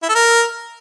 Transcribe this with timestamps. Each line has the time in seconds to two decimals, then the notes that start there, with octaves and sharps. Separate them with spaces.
0.03 E4
0.09 A4
0.15 A#4